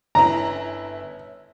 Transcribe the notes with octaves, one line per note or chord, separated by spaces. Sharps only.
G1 C#4 E4 A#5